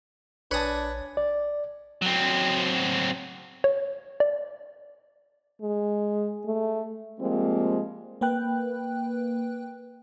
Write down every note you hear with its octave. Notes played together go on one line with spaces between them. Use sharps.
A#1 D4 B4 C#5 G#5 A5 D#6
D5
F#3 C4
C#5
D5
G#3
A3
F3 G3 G#3 A#3 C4
A#3 B4 G5 F#6